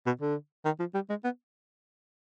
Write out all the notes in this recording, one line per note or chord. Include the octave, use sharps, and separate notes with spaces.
B2
D3
D#3
F3
G3
G#3
B3